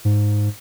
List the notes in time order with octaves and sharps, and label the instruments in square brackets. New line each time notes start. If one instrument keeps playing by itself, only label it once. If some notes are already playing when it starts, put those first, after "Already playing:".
[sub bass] G#2